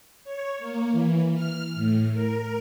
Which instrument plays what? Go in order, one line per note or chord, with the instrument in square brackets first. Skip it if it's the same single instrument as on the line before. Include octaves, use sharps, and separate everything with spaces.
[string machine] C#5
A#3
E3
F6
A2
A#4